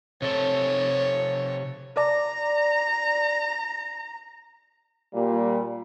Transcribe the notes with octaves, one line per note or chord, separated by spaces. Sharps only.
C3 A4 C#5
D5 A#5
A#2 G3